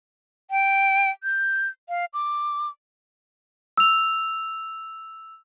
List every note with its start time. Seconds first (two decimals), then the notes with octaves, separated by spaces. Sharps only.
0.51 G5
1.23 G6
1.89 F5
2.13 D6
3.77 E6 F7